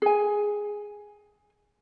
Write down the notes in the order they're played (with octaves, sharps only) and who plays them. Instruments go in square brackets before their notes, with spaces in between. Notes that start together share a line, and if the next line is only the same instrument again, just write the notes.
[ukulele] G#4 G#5